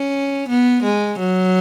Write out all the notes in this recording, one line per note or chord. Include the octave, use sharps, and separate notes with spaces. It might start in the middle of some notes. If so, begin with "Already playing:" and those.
Already playing: C#4
B3
G#3
F#3